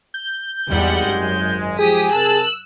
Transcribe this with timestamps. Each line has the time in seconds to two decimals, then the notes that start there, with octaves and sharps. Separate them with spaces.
0.14 G6
0.70 G#1 E2 G3 G#3 F#5
1.07 F#2
1.79 F3 G#3 G4 G#4 D#6 B6
2.12 C3 A#4 A5 E6 F#6